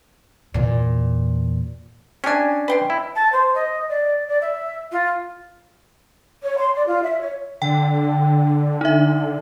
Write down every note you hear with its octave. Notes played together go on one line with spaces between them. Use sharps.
E2 A#2
C#4 D4 G4 G#5
B4 G5 C6
E4
A5
C5
D#5
D5
D5
E5
F4
C#5
C6
D5
F4
E5
C#5
D3 G5
D#4 E5